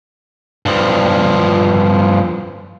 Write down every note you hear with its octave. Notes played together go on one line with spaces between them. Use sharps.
G2 F3